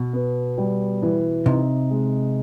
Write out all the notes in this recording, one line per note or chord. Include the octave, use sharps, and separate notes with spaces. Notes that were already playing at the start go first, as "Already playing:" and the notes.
Already playing: B2
B3
G3
E3
C3 D#4
G#3